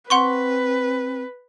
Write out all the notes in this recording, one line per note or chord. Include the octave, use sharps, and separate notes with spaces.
C4 B4 F#5 C6 C#6